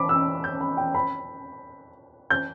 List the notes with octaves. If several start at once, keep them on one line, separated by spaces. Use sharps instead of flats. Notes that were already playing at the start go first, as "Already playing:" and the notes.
Already playing: B5 D6
E6
G6
B5
G5
B5
G6